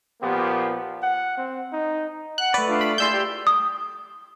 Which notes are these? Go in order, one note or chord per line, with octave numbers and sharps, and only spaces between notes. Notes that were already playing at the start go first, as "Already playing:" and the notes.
A#2 F3 A#3 B3 G4
F#5
C4
D#4
F#5 F#6
A3 B4 D5
D4 F4
B5
E4 G#4 D5 C6 E6 G6
G4 D5
D#6